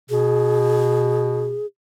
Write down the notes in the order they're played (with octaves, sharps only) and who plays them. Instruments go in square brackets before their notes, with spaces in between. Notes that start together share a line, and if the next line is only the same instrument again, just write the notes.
[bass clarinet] B2 [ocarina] G#4